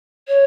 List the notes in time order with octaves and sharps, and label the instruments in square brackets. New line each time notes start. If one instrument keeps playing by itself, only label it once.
[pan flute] C#5